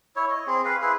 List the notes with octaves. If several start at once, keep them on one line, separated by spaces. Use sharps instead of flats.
E4 C#5
D#5
C4 G#4
B4 F5
E4 G#4 B4